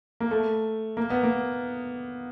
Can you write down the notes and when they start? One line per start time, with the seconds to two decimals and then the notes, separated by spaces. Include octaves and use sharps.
0.20 A#3
0.31 A3
0.97 A#3
1.10 B3
1.23 A#3